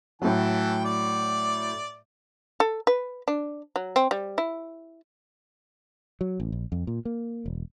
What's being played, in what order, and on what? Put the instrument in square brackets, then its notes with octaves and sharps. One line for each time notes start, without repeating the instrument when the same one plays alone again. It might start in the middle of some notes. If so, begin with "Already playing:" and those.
[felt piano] A2 F#3 [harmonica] E3 G5 A5
[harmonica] D5
[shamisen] A4
B4
D4
F#3
C4
G3
E4
[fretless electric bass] F#3
A1
A#1
F2
A#2
A#3
E1